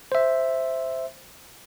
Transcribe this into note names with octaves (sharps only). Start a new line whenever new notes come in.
C5 E5